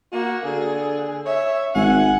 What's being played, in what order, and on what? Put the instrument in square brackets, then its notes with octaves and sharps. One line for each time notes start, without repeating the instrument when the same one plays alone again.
[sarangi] A#3 [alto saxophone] F#4
[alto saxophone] D3 [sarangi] G#4
[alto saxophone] C#5 [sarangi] E5
[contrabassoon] G#1 [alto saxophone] F#5 [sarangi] G#5